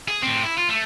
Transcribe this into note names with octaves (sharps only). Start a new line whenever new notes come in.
G#4
A2 C4
E4
F4
A3